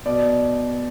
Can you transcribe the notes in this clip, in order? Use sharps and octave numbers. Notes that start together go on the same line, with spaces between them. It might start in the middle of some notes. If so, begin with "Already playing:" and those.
B2 D5